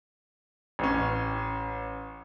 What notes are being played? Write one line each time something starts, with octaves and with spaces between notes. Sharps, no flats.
A1 C#4